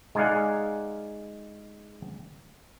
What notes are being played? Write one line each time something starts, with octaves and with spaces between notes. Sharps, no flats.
G#3 D#4 G#4 D5 F5 F#5